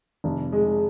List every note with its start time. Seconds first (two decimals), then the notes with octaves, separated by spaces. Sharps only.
0.24 F1
0.52 G#3